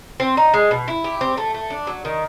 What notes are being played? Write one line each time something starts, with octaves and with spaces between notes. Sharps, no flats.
C4
D#4
G#3
B2
E4
G4
C4
A3
A3
D4
F#3
D#3